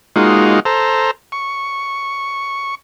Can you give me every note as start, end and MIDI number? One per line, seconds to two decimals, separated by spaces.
0.16 0.60 56
0.16 0.60 58
0.16 0.60 63
0.16 0.60 65
0.16 0.60 66
0.65 1.11 69
0.65 1.11 72
0.65 1.11 82
1.32 2.75 85